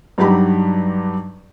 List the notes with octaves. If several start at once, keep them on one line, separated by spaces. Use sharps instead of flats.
G2 F#3 D#4 G4 A#5 B5